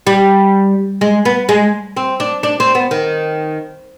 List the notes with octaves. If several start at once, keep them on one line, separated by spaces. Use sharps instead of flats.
G3
G#3
B3
G#3
C4
D4
D4
C4
B3
D#3